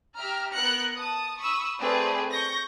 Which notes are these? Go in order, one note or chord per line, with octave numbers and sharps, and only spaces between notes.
G4 E5 A#5 F6
B3 A#4 F#6 A#6 C#7
A5 D#6
B5 C#6 D#6 E6
A3 C4 G#4 B4 D5
C#6 G6 A#6